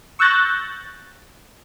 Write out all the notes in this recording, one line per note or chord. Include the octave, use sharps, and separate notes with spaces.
C#6 E6 F#6 G6 A6 A#6